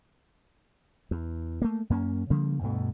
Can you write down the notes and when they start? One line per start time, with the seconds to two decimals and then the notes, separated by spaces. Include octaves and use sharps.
1.11 E2
1.62 A3 A#3
1.90 F#2 A#3 C#4
2.30 C#3 F3 G3 A#3
2.61 D2 G2 B2 A3